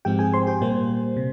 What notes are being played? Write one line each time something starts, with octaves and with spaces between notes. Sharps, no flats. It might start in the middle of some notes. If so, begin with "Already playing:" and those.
G#2 F3 G#3 C4 G4 G5
G#4 G#5
C5 C6
G4 G5
A#2 G3 A#3 C5
C3